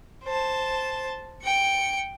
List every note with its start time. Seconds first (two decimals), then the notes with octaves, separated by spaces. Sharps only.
0.24 C5 A5
1.43 G5 C#7